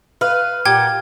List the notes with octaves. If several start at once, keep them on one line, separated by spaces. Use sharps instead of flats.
B4 F5
A#2 G4 F#5 G5 G#6